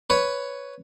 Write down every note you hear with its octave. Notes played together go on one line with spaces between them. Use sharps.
B4 C#5